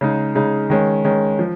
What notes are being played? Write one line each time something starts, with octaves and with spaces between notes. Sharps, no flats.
C#3 G#3 D#4
C#3 G#3 D#4
D#3 G#3 C#4
D#3 G#3 C#4
F3